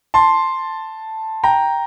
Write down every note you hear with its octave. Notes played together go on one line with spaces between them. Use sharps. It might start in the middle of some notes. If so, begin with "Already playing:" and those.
A5 C6
G5 A#5